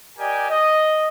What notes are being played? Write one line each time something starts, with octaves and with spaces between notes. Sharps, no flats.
G4 A#4 D5 D#5 G5 G#5
D#5